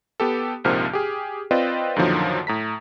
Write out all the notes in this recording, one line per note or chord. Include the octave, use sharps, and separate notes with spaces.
B3 G4 A4
A#1 G#2 C3 F3 A#4 F6
G4 G#4
C4 F4 B4 D5 D#5 G5
F#2 A#2 D3 D#3 F3 F#3
A2 A#5 B6